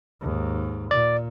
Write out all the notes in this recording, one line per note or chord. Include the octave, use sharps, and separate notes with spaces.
D#2 G#2
A#2 D5